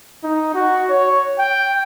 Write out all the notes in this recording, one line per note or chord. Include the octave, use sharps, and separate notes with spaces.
D#4
F#4
C#5
G5